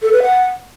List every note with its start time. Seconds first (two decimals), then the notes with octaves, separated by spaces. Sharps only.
0.02 A4
0.13 B4
0.23 F#5